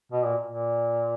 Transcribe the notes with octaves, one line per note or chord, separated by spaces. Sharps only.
B2
A#2
A#2